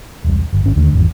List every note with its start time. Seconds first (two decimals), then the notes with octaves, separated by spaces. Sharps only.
0.24 E1 C2
0.53 G1
0.64 G#1 C#4
0.76 D#2 D3 A3
0.93 G#1 E2 G2